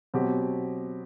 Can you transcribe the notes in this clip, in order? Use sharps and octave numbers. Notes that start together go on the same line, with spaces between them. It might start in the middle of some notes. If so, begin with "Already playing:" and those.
B2 F#3 C4 G4